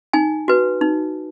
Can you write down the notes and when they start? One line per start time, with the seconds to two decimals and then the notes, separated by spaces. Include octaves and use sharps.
0.13 D#4 G#5
0.48 F#4 B4
0.81 D#4